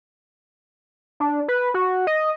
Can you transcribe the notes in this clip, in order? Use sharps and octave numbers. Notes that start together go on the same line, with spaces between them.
D4
B4
F#4
D#5